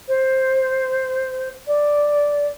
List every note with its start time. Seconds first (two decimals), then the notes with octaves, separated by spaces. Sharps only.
0.08 C5
1.67 D5